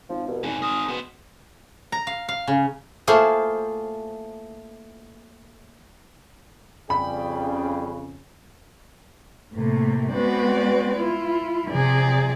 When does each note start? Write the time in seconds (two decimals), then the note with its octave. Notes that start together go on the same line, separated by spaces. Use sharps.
0.09 G#1 F3
0.28 C2 B2
0.44 G#1 F2 B2 G#4
0.62 A#4 C5 D#6
0.89 B2 B3 C5
1.92 A#5
2.07 F5
2.28 F5
2.48 C#3
3.07 A3 A#3 E4 F4 G#4 C5
6.90 F2 C#3 G3 G#4 D5 G5 B5
9.54 A2 C3 A3 A#3
10.12 G#3 B3 C4 F#4 B4 D5
10.96 E4 F4
11.70 C3 F3 G#4 D5